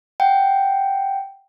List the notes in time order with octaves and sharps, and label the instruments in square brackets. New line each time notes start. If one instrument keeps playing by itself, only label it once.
[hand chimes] F#5 G5